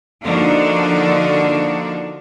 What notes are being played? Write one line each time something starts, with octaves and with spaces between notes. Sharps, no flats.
D3 F3 A#3 D4 D#4 F#4